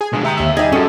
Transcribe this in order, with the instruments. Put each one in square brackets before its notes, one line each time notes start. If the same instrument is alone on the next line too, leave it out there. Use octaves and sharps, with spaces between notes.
[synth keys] G#4 G#5
[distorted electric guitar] B2 D4 [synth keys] G#3
[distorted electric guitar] G4 A#5 [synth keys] E5 G5 D#6
[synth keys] D#2 E5
[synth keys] G3 G4 G#4 [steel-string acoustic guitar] D#4 E5
[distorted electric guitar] C#4 F#4 [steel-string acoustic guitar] A4